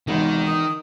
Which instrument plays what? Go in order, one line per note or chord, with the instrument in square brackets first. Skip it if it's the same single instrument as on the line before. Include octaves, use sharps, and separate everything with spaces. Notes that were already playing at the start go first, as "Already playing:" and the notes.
[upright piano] G#1 G#2 C3 [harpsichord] E2 [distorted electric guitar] D#3
[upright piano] D#4 A#4 [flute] D#6